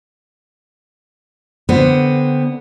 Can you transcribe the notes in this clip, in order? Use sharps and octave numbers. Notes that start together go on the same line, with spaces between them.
D3 B3 C4